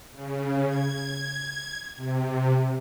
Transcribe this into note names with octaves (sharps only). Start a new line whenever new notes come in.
C#3
G#6
C3